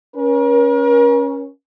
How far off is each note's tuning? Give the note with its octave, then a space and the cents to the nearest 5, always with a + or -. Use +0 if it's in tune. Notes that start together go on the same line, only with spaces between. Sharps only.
C#4 +0 A#4 +40